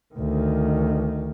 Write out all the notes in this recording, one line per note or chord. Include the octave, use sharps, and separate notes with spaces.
D2 D#3